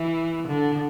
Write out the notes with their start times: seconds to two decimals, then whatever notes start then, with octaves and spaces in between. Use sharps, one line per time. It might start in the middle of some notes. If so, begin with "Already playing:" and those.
Already playing: E3
0.48 D3